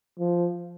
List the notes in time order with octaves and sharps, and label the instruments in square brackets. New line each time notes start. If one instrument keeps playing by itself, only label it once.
[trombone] F3